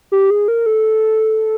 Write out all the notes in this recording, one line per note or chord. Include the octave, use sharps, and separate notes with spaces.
G4
G#4
A#4
A4